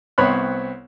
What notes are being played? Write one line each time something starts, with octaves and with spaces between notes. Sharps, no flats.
C2 B3 C4 C#5 B5 F#6